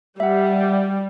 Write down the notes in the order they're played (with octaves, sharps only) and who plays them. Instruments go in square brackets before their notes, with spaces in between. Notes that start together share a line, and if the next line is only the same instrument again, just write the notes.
[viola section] G3 [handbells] E5 F#5